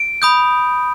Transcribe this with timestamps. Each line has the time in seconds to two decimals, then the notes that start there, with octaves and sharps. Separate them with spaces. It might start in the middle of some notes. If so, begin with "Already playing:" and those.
Already playing: D7
0.22 B5 D#6 G6